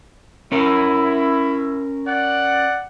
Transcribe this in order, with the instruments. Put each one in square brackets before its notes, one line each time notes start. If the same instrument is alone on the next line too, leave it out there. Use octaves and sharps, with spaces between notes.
[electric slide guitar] C#4 A#4 [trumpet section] E4
[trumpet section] D5 F#5